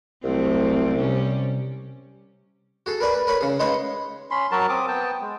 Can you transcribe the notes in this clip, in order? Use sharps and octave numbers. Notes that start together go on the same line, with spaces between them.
C2 F#3 A3 C4
C3 G3 C#4
F#4 G#4 A4
A#4 B4 D5 G#5 D6
B4
A#4 B4 C#5 B5
C#3 G#4
G#3 D#4 B4 C#5 F5 F#5
C#4 B5 C6
F#3 F#4 A#4 A5
C4 D6 D#6
B3 G5 A5
G#3